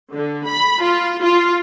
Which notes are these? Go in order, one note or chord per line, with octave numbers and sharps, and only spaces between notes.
D3
B5
F4
F4